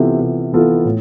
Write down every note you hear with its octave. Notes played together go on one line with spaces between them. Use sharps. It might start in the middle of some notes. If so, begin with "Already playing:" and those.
Already playing: C3 E3 B3 F4 A4
C3
E3 B3 F4 A4
A2